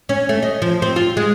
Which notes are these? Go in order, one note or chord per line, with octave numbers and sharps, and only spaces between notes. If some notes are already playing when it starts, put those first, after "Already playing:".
C#4
A3
D#5
F3
C4
F4
G#3